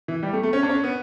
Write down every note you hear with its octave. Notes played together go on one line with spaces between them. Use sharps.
E3
G3
A3
A3
C#4
D4
C#4
B3